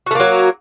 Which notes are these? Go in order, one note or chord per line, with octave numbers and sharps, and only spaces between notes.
F#3 A3 A#3 F#4